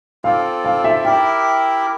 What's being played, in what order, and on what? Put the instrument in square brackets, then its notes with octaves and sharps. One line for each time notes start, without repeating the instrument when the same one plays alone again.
[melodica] C4 F4 A4 D5 [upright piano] F5
[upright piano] F5
E5
[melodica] E4 G4 A#4 E5 [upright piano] G5